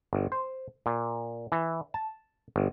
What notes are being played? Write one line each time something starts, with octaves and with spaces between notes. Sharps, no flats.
G1
C5
A#2
E3
A5
G1